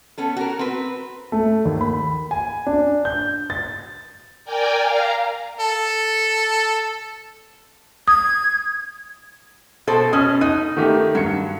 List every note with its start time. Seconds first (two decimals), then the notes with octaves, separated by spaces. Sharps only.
0.18 B3 C#4 A4
0.37 F#4 A#4
0.59 C4 B4
1.32 A3
1.65 D#2
1.81 B5
2.31 G#5
2.66 D4
3.05 G6
3.50 A6
4.45 A#4 D5 G5 G#5
4.82 F5 A#5
5.59 A4
8.08 D#6 G#6
9.87 B2 A4 C5
10.13 B2 C#4 D#6
10.41 D#4 F#6 D#7
10.77 D#3 A3 G4
11.15 G2 F#3 C#7